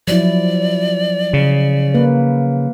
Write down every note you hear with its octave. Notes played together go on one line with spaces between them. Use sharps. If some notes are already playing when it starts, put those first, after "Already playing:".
F3 F#3 E4 D5
C#3
A#3 B4